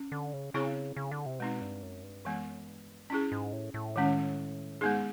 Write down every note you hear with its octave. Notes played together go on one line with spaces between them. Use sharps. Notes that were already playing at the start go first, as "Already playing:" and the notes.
Already playing: C#4
D3
C#3
C#3 C4 E4 G#4 C#5
C#3
D3
C3
B2 G#3 C4 D#4
G2
F#2
G2
F#2 E3 G#3 B3
G2
G#2 C#4 E4 G#4
G#2
A2
A2
D#3 G#3 C#4
G#2 G#3 B3 D#4 G#4